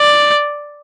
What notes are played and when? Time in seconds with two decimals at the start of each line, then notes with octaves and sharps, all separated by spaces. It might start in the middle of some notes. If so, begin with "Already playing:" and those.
Already playing: D5